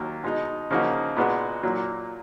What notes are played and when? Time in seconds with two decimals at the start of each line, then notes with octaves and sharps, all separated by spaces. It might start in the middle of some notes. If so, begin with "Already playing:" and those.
Already playing: D#2 F#3 A#3
0.24 B2 G#3 D#4
0.71 C#3 F3 A#3 D#4 F#4
1.16 A#2 G#3 B3 F#4
1.63 A#2 F#3 A#3